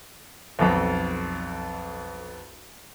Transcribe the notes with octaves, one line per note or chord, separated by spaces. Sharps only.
B1 F2